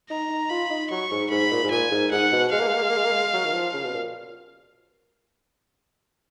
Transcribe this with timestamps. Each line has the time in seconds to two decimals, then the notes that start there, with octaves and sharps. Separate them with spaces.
0.10 D#4 A#5
0.29 D#4
0.50 F4 B5
0.70 D#4
0.91 F#3 C#6
1.11 G#2
1.30 G#2 B5
1.51 A#2
1.63 G#2
1.71 A#2 G#5
1.91 G#2
2.11 G#2 F#5
2.32 B2
2.52 G#3 F5
2.60 A#3
2.67 G#3
2.75 A#3
2.82 G#3
2.90 A#3
2.97 G#3
3.04 A#3
3.12 G#3
3.33 F#3
3.45 D#3
3.53 F3
3.73 C#3
3.84 B2
3.94 A#2